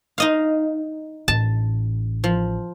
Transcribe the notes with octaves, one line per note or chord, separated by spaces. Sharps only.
D#4 D#5 F5
A1 A5
F3